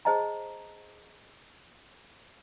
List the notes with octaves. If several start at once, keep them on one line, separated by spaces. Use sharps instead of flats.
G#4 C5 D#5 A5 A#5